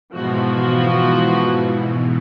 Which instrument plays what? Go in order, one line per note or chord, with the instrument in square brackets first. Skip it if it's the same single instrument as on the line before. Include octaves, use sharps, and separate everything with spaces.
[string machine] G#2 B2 E3 [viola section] F3 B3 F#4